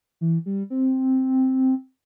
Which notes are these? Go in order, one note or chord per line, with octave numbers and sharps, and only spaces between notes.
E3
G3
C4